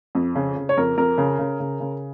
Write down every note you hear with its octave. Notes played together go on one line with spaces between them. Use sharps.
F2
C#3
C#3
C#5
F2 A#4
F2 A#4
C#3
C#3
C#3
C#3